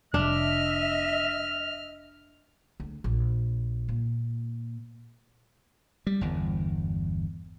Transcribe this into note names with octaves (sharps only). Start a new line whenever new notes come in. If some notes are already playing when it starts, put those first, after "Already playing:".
F1 D4 D#5 E5 F6
D2
A#1
A#2
G3
G1 E2